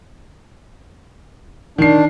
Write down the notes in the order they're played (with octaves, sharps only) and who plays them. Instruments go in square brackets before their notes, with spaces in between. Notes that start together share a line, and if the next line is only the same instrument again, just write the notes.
[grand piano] D#3 C7 [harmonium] D4